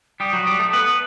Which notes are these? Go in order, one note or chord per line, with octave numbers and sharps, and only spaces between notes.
G3 G4 D#6
F#3 F#4
G3 G4
A3 A4
B3 B4